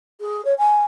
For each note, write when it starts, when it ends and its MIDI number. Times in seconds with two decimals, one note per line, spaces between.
0.20 0.44 68
0.44 0.54 73
0.58 0.84 80